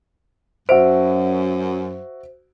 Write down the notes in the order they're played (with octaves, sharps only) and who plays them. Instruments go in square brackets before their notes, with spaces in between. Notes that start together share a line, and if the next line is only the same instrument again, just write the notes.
[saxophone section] F#2 [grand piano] F#4 E5 D7 [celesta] C5